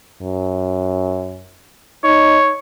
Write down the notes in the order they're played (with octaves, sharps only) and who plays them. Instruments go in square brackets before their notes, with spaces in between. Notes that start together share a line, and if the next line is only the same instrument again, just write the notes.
[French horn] F#2
[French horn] D#4 [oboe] C#5